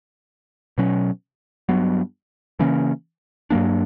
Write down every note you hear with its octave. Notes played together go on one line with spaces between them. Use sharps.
B2 F#3 C#4
G2 F#3 B3
C#3 E3 A#3 C#4
G2 F#3 A#3 D4